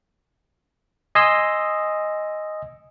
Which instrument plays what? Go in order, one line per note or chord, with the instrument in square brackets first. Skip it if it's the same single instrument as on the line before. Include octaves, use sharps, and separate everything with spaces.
[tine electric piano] D#5 G#5 C6 D#6 E6